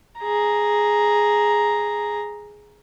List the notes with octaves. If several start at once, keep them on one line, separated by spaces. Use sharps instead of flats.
G#4 A#5